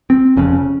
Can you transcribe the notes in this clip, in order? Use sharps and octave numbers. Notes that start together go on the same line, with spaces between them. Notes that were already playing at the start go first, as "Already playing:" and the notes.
C4
F1 F2 C#3 C#4